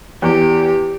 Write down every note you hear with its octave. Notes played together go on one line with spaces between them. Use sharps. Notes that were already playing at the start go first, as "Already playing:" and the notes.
E2 G4